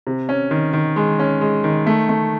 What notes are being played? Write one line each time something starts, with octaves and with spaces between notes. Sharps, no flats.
C3
C#4
D#3
D#3
G#3
C#4
G#3
D#3
A3
A3